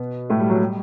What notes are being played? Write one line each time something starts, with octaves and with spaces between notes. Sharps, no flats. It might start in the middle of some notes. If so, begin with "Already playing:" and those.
Already playing: B2 B3
A2 A3
G3
F#3
G3